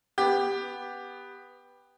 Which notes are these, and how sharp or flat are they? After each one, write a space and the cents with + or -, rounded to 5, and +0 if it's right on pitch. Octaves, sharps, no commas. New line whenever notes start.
B3 +0 G4 +10